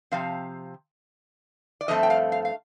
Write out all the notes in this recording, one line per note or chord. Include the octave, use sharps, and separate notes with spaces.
C3 F3 C4 F5
D5
G2 F3 A3 C4 D#5
G5
F5
F5
F5